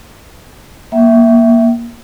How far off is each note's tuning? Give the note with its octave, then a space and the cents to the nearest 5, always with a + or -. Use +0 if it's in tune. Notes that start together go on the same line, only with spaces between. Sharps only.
A#3 +15 E5 +0 G5 -40